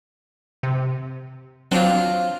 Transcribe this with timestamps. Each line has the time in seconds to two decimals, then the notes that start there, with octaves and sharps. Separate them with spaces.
0.63 C3
1.71 F#3 C4 D4 F4 C5